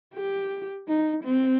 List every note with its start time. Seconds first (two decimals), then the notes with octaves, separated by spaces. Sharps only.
0.15 G4
0.88 D#4
1.24 C4